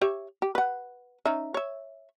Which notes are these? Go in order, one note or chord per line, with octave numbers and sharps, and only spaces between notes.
G4 C#5 E5
G4
B4 F#5
C#4 D#4 E5
C#5 E5